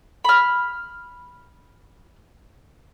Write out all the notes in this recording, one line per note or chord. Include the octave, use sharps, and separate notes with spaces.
B5 F6